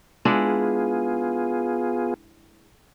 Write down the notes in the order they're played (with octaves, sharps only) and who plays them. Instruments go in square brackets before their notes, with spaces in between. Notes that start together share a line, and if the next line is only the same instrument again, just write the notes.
[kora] G#3 D4 E4 [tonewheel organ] B3 F4 G#4